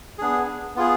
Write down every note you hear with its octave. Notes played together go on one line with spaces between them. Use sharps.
B3 D4 G#4
B3 F4 G#4